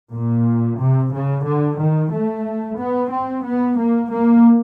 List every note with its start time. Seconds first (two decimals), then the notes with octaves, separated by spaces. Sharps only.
0.13 A#2
0.80 C3
1.13 C#3
1.46 D3
1.79 D#3
2.12 A3
2.78 B3
3.12 C4
3.45 B3
3.78 A#3
4.11 A#3